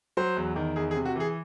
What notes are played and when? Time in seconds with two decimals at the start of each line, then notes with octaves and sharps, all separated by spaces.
0.17 F#3 C5
0.36 E2
0.56 D#3
0.76 E2 G#4
0.91 G#4
0.95 C3
1.05 F#4
1.16 E3 G#4